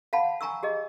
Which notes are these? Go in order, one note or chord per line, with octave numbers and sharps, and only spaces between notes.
F5 F#5 A5 B5
G#5 A#5 C#6 E6
G4 G#4 D#5